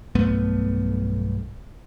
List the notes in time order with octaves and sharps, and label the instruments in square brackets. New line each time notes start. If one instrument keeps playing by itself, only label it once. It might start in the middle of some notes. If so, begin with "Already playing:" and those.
[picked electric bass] B1 G2 A3 B3